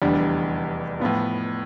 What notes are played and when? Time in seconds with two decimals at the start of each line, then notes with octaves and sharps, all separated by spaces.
0.02 F1 E2 D3 G3
1.00 A2 F3 B3 F4